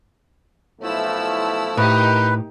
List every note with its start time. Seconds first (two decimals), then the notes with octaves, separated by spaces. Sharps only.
0.81 B1 F3 A3 E4 E6
1.77 A2 D#4 G4 A#4 B4